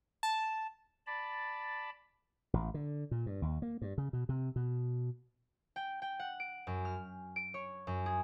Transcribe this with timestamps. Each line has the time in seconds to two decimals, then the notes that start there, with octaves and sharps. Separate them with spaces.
0.23 A5
1.07 D5 A5 B5
2.54 A1
2.74 D3
3.11 A#2
3.26 G2
3.42 D#2
3.62 A#3
3.82 G2
3.98 C#3
4.13 B2
4.29 C3
4.56 B2
5.76 G5
6.02 G5
6.19 F#5
6.40 D7
6.67 F#2
6.85 F6
7.36 D7
7.54 C#5
7.87 F#2
8.06 G#4